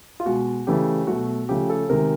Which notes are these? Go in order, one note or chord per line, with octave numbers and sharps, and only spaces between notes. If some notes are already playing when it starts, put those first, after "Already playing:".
F4
B2 G#3 F#4
C#3 E3 A3 G4
B2 F#3 A3 F#4
C#3 F3 A3 G4
A4
C3 D#3 G#3 A#4